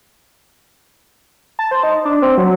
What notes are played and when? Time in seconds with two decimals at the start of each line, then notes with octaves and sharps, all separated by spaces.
1.59 A5
1.71 C5
1.83 D#4
2.05 D4
2.22 C4
2.37 F#3